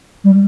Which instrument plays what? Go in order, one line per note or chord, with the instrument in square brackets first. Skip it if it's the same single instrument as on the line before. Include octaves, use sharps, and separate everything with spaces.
[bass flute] G3